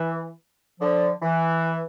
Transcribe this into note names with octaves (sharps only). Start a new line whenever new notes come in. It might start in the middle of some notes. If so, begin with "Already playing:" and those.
Already playing: E3
D3 F3
E3